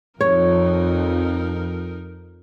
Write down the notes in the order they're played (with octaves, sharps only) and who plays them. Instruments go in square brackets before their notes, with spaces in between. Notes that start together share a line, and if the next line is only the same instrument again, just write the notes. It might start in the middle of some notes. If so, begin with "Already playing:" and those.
[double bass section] F2 [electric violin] D#4 A#4 [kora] C#5